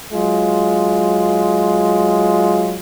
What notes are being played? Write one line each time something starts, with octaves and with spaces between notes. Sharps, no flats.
F#3 G#3 F4